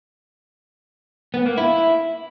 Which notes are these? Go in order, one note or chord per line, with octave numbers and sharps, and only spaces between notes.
B3
A#3
E4